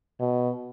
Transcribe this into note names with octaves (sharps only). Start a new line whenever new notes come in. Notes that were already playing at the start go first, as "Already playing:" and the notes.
B2